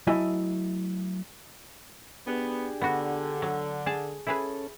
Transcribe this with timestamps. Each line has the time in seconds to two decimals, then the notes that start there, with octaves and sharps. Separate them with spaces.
0.07 F#3 A3 E4 D#5 G#5
2.27 B3 D4 G4 G#4
2.81 D3 B3 F#4
3.42 F#3
3.86 G#4 A5
4.27 C#4 E4 G#4 A4 B4